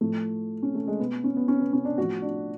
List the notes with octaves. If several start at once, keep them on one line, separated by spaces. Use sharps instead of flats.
A2 F3 A3
C#4
A3
G#3
B2 B3
C#4
B3
C#4
B3
C#4
D4
A2 F3 F#4
D4